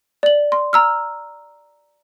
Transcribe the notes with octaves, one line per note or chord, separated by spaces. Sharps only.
D5 F#7
C6
A#5 E6 F6